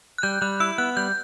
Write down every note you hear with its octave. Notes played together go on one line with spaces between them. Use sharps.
F#6
G3 G6
G3 F#6
E4 E6
B3 F#6
G3 G6